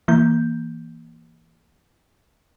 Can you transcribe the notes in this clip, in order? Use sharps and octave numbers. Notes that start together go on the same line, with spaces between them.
E3 A#3 G6